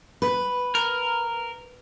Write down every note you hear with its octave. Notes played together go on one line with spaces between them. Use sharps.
B4
A#4